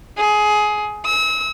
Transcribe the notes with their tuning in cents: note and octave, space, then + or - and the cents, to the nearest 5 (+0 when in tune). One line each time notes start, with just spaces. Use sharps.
G#4 +20
E6 -35